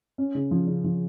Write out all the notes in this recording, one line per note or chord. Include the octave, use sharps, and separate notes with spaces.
C#4
C#3
F3
C#3
F3